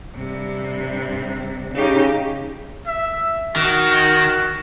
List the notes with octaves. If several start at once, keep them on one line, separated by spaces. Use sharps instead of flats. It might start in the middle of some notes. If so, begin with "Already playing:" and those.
G2 C3
C#3 D#4 G4
E5
D#3 F#4